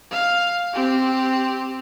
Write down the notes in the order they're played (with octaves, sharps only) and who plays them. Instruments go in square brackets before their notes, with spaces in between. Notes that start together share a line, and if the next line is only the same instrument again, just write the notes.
[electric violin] F5
C4 G4